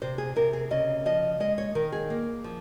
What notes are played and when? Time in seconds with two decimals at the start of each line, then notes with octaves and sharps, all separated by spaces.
0.02 C3 C5
0.18 G#4
0.36 C3 A#4
0.53 G#4
0.71 C#3 D#5
1.06 F3 D#5
1.40 G#3 D#5
1.58 C#5
1.75 D#3 A#4
1.92 G#4
2.10 A#3
2.44 F3